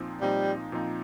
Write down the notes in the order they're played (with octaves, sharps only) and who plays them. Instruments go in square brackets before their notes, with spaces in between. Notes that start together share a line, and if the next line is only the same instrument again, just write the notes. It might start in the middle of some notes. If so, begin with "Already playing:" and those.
Already playing: [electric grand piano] A#2 F3 C4 D#4
[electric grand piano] A#2 F3 C4 D#4 [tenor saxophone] G3
[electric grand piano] A#2 F3 C4 D#4